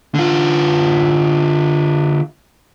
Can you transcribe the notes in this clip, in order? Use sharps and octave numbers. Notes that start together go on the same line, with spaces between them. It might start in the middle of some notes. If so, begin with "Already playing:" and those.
D3 F4